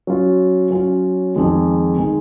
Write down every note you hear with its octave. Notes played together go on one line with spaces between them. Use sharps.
F#3 C#4 F4
F#3 C#4 F4
F2 D#3 G#3 D#4 G#4
D#3 G#3 D#4 G#4